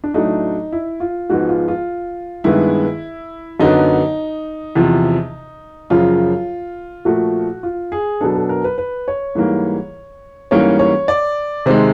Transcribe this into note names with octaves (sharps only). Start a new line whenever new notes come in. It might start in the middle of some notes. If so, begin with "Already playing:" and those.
D4
A2 F#3 A3 D4 D#4
E4
F4
G#2 F3 G#3 B3 F#4
F4
F4
G2 D#3 G#3 B3 E4
F#2 D3 F#3 B3 D#4
E2 C3 F3
F#2 C#3 F3 F4
A#2 F3 A3 F#4
F4
G#4
B2 F#3 B3 D4 A4
A4
A#4
B4
B4
C#5
G#2 E3 G3 A#3
G#2 E3 G3 A#3 C#4 C#5
C#5
D5
C3 D#3 G#3 C5